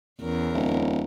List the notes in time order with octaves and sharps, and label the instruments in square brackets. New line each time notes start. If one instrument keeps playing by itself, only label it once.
[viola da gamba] E2 C#4 A#4
[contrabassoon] D1